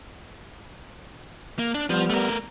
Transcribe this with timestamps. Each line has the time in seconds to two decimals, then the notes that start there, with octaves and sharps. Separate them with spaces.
1.59 A#3
1.74 D4
1.90 F3 G3 B3 F6
2.10 A3 A#4